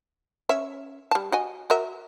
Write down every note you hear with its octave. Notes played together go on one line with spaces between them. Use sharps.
C#4 C#5 E5
G3 A5
F#4 D#5 G#5
F#4 A#4 E5